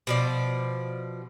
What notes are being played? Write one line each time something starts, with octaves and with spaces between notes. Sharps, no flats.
B2 F3 D5